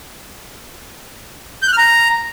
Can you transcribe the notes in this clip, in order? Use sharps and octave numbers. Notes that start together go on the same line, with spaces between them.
G6
F#6
F6
A#5